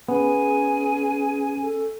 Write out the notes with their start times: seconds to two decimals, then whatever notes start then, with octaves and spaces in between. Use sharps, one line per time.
0.09 B3 C#4 G#4 G#5
1.61 A4